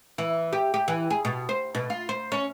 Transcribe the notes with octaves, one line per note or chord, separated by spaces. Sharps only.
E3
G4
G4
E3
G#4
B2
C5
B2
F4
C5
C#4